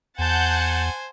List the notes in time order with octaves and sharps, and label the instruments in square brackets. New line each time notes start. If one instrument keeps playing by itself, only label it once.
[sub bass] E2 [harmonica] C5 G#5 [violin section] F#5 A5 G6